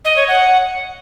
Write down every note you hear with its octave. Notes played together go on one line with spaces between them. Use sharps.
D#5
C#5
F#5